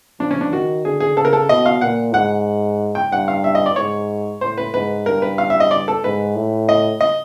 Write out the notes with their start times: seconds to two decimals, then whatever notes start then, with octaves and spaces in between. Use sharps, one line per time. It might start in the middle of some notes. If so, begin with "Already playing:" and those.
0.20 F3 D4
0.31 C#4
0.41 D4
0.52 D#3 F#4
0.84 D3 G#4
1.00 G#4
1.17 C#3 A4
1.25 A#4
1.33 A4
1.49 B2 D#5
1.66 F5
1.81 A#2 F#5
2.14 G#2 F#5
2.95 G5
3.12 G2 F#5
3.28 F5
3.44 E5
3.55 D#5
3.66 D5
3.76 G#2 C#5
4.41 A2 C5
4.58 B4
4.74 G#2 B4
5.06 G2 A#4
5.22 B4
5.38 F5
5.50 E5
5.60 D#5
5.71 D5
5.88 A4
6.03 G#2 B4
6.36 A2
6.69 D#5
7.01 D#5